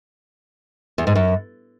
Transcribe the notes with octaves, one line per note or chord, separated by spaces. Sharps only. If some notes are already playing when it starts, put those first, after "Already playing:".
E2
G#2
F#2